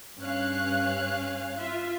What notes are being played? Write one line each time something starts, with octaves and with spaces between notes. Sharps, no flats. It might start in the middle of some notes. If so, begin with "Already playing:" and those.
G2 C#4 F5 F#6
F4 E5